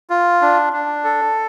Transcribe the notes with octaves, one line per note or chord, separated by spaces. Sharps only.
F4
D4
D4
A4